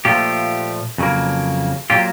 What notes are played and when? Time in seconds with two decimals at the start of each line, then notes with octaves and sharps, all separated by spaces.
0.05 A#2 F3 A3 F4 G4
0.98 F2 C#3 F#3 A#3
1.90 A#2 F#3 A#3 F4 G4